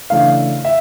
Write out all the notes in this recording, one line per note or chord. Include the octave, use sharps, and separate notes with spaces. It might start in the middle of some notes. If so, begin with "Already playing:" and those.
C#3 E3 A3 D4 F5
E5